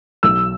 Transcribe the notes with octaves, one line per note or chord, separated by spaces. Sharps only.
B1 E6